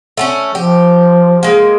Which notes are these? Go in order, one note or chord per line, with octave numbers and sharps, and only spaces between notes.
A3 C4 C#4
F3 G4
G#3 A#3